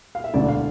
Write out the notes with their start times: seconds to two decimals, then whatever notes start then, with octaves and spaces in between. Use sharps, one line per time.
0.15 F5
0.24 E5
0.34 E1 D2 D3 A3 D5
0.48 F5